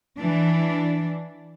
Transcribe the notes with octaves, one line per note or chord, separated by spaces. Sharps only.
E3 D4